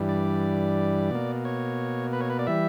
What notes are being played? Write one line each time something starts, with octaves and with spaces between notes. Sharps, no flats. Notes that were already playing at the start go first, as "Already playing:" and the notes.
Already playing: G2 E3 G3
D5
B2 A#3
C#5
B4
C#5
B4
D5
E3 G3 E5